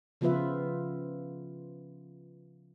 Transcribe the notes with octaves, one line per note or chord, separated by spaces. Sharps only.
C#3 F3 B3 F4 B4 E5